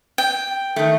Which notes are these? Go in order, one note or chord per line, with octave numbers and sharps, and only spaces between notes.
G5
D#3 A3